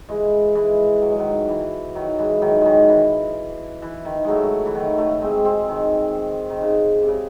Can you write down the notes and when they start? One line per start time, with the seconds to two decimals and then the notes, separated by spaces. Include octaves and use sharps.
0.09 E3 G#3
0.55 E3 G#3
1.02 F#3
1.11 G#3
1.19 D#3 F#3
1.49 E3
1.95 D#3 F#3
2.18 E3 G#3
2.42 D#3 F#3
2.61 D#3 F#3 G#3
2.88 E3
3.82 E3
4.05 D#3
4.24 F#3 G#3 A3
4.66 E3
4.75 D#3 F#3
4.98 F#3 A3
5.22 G#3 C4
5.45 G#3 C4
5.68 D#3
6.50 D#3
6.62 C#3
7.03 C3
7.08 C#3